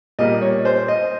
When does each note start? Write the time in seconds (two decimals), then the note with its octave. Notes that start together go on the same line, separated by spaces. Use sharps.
0.19 A#2 G3 A#3 D#5
0.41 C#5
0.65 C5
0.88 D#5